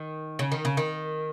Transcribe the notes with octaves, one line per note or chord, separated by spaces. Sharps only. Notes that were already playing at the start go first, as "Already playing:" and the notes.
Already playing: D#3
C#3
D#3
C#3
D#3